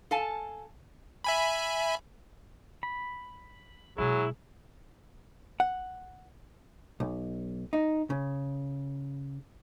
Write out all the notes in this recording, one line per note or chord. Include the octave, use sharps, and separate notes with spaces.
A4 F5 G#5 A5
E5 G#5 B5
B5
B2 F#3 G#3 E4 G#4
F#5
B1
D#4
C#3